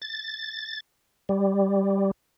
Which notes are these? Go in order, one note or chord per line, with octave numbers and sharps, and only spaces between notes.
A6
G3